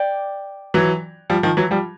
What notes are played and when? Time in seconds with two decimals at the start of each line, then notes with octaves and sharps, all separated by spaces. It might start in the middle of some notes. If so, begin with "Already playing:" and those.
Already playing: D5 G5
0.74 E3 F#3
1.30 F3 G3
1.43 D#3 F3
1.57 E3 F#3
1.71 F3 G3